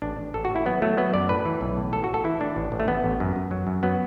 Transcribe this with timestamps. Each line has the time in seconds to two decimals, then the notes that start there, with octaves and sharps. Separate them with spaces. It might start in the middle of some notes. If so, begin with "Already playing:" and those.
0.02 A1 D4
0.18 A1
0.34 A1 A4
0.45 F#4
0.50 A1
0.56 E4
0.66 F#3 B3
0.82 F#3 A3
0.97 F#3 B3
1.14 F#2 D5
1.29 A2 B4
1.45 E3
1.61 B1
1.77 A2
1.92 A1 A4
2.04 A1 F#4
2.14 A4
2.24 E3 E4
2.40 A2 D4
2.56 A1
2.72 A1
2.80 A3
2.88 A1 B3
3.04 A1
3.20 F#2
3.36 F#2
3.51 F#3
3.67 F#2
3.83 F#3 B3